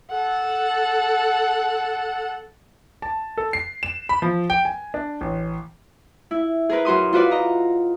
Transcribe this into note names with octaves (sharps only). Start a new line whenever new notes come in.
A4 F#5
A5
A4
C7
E7
B5
F3
G5
G#5
D4
A1
E4
G#4 A#4 B4
F#2 F#4 C6 D#6
F4 F#4 B4 D5
D#5 A#5